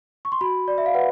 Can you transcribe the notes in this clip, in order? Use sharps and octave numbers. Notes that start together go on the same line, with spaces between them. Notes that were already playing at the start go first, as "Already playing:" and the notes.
C#6
C6
F#4 B5
D5
E5
F5
B4 F#5